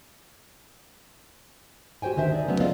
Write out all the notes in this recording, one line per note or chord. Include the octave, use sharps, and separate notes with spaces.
F#4 G4 C5 G5 G#5
D2 D3 D#3 C5 E5
D#4 D5
C#3 F#3 A3 B3 C#4
F4 A4 D5 D#5 F5